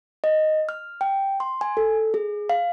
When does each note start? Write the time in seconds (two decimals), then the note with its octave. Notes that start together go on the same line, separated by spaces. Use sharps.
0.24 D#5
0.69 F6
1.01 G5
1.40 C6
1.61 G#5
1.77 A4
2.14 G#4
2.49 F5